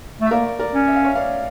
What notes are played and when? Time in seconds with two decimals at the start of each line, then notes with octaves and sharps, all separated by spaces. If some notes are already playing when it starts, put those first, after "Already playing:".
0.21 A3
0.26 E5
0.31 A#3 A#4 D5
0.59 A#4 D5
0.74 C#4
0.88 E5
0.96 F5
1.04 C#5 E5
1.15 D5 F5